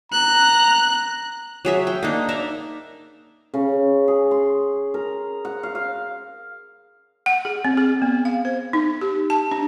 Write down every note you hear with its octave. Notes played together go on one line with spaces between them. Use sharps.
A#5 F#6
F#3 G#4 E5
G5
A#3 D4 D#4
D5 E5 A#5
C#3
G#4
C6
A#4
F#5
F5
F5
F#5
G#4
C4
G#4
B3
F5
C5
D#4
G4
A5
D4